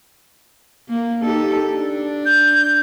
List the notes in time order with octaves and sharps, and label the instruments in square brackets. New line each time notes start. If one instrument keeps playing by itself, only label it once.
[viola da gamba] A#3
D#4 G4 A4
D4
[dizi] G6